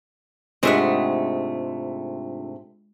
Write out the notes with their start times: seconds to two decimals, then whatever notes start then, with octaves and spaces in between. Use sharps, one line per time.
0.63 G#2 C3 G#3 A3 D4 F4 E5 F#5